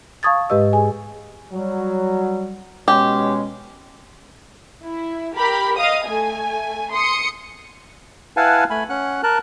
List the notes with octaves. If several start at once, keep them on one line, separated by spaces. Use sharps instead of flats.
F5 A5 C#6 D#6 G#6 A6
G#2 G#3 G4 B4 D#5 E6
G#4 G#5
F#3 G3
B2 G#3 C#4 G4
E4
G4 A#4 B5
D#5 F5 D#6
A3 G#5
C6 D#6 C#7
E4 B4 F5 F#5 G#5 A5
A3 G#5 B5
C#4 F#5 F#6
A#4 A5 F#6